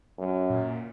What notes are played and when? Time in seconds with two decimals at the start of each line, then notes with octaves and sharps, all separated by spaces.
0.18 F#2
0.50 A#2